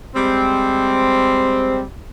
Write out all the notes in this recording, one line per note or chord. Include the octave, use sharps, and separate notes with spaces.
G3 G#3 C4